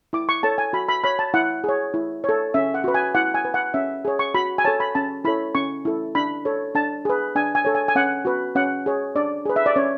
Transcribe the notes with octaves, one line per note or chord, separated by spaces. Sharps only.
E4 D6
C#6
A4 C#5 A5
G#5
F#4 B5
B5
C#5 B5
A5
E4 F#5
G#4 C#5
E4
A4 C#5
C#4 E5
F#5
F#4 B4
G#5
E4 F#5
G#5
B4
F#5
C#4 E5
G#4 C#5
C#6
F#4 B5
G#5
A4 C#5 A5
B5
C#4 A5
E4 A4 C#5 B5
C#4 C#6
E4 A4
D4 B5
A4 C#5
D4 A5
G#4 B4
D4 G#5
G#5
A4 C#5
G#5
G#5
C#4 F#5
F#4 B4
C#4 F#5
G#4 C#5
D4 D5
G#4 B4
E5
D5
C#4 C#5